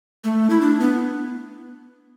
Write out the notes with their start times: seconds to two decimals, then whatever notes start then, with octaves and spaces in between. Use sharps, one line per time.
0.24 A3
0.50 E4
0.61 D4
0.80 B3